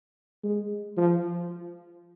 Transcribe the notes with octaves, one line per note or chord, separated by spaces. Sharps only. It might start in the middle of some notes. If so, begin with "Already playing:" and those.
G#3
F3